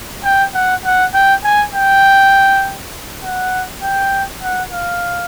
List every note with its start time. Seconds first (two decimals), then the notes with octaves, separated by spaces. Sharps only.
0.24 G5
0.54 F#5
0.84 F#5
1.14 G5
1.44 G#5
1.74 G5
3.23 F#5
3.82 G5
4.42 F#5
4.72 F5